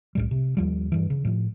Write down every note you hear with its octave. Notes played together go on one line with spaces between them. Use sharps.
C2 A2 G3
C3
D#2 F3 G3
G2 E3
C#3
A2 F3